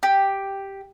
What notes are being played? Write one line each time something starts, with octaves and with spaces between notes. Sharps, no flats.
G4